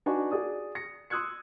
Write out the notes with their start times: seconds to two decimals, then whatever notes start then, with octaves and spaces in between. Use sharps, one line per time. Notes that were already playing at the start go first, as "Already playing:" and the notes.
0.06 D4 D#4 F#4 B4 G#5 C#6
0.32 F#4 G#4 D5 D#6
0.75 A#6 C#7
1.10 C6 D#6 E6 F#6 G#6 C#7